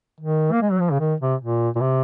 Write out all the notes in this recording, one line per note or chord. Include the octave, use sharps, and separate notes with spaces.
D#3
A#3
G#3
F#3
F3
C#3
D#3
C3
A#2
A#2
C3